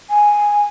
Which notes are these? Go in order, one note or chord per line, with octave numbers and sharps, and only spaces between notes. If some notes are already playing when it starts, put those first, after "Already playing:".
G#5